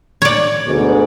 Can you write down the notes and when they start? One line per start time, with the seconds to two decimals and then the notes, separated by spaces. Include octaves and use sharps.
0.22 C#5 D5
0.67 D2 G#2 B2